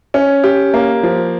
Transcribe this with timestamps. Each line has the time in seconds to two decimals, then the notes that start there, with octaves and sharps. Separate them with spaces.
0.14 C#4
0.44 G4
0.74 A#3
1.03 F3